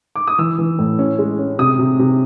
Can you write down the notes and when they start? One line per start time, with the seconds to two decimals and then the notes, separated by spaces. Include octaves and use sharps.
0.16 D6
0.27 D#6
0.38 E3 E6
0.58 E3
0.79 A2
0.99 C#4
1.19 G#3
1.39 C#4
1.59 C3 D#6
1.79 C3
1.99 C3